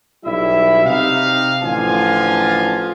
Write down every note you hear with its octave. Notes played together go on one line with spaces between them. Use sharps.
B1 G3 E4 E5
C3 D#4 F5
A1 D3 F3 F4 F5 G#5